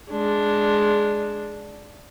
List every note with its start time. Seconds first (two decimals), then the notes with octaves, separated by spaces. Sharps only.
0.11 G#3 D4